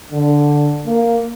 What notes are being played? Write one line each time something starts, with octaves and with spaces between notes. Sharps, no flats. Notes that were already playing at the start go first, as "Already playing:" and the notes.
D3
A#3